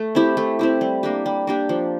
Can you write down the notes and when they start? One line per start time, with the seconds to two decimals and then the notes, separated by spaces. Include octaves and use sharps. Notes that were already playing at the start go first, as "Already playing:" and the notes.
Already playing: A3
0.15 C4 E4 G4
0.37 A3
0.59 C4 E4 G4
0.81 G3
1.03 A#3 D4 G4
1.26 G3
1.47 A#3 D4 G4
1.69 F3